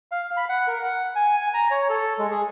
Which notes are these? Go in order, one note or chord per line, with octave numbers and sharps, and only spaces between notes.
F5
B5
F#5
A#4
F#5
G#5
G#5
A#5
C#5
A4
G#3
G#4